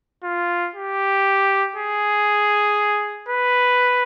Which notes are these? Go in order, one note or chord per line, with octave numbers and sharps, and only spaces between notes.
F4
G4
G#4
B4